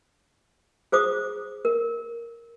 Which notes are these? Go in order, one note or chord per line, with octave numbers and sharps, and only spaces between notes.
G#4 C5 D6 D#6
A#4